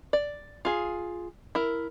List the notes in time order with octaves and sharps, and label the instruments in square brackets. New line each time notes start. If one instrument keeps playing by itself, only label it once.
[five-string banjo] D5
F4 G#4
E4 A#4